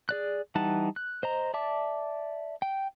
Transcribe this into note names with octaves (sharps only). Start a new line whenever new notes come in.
G#4 D5 F#6
E3 G3 D#4 F#5 A5
F#6
C5 D#5 A#5
D5 E5 A5 D6
G5